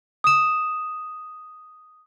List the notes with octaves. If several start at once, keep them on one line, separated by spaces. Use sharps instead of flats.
D#6 E7